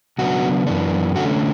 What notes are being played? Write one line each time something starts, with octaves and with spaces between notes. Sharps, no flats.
C#3 F#3 B3 D4 F#4
F#2 E3 B3 D4
D3 A3 C#4 F#4